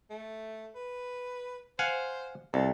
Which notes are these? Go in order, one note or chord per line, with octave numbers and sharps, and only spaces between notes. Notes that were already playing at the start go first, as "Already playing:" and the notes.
A3
B4
C5 F5 F#5 G#5
C2 A4